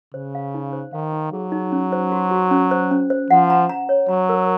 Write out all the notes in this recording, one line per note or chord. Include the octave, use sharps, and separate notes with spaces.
C#3 C5
F5
D#4
C5
D#3 F5
D#4
F#3 G#4
D#4
C#4
C5
F#4
F#4
C#4
C5
C#4
C5
F3 F#5
A#5
A#5
C#5
F#3 A#5
A#4